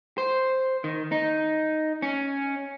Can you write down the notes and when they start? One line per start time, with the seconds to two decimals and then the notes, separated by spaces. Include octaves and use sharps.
0.18 C5
0.84 D#3
1.12 D#4
2.02 C#4